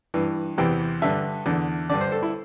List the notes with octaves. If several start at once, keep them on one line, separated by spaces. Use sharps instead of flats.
G2 E3
E2 C3 E3 G5
G2 D3 E5
E2 D3
G2 D3 D5
C5
A4
E4